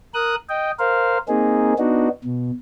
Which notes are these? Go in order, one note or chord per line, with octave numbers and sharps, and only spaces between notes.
A#4 D#6 F#6
D#5 G5
A#4 C5 F5
A#3 C4 D#4 G#4
B3 D4 D#4 F#4
B2